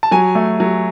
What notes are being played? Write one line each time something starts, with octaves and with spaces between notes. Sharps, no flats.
A5
F#3 G#5
A3
F#3